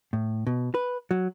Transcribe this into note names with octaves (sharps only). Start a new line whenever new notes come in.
A2
B2
B4
F#3